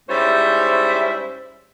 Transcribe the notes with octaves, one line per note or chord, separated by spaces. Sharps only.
G#2 G3 C#4 E4 C5 E5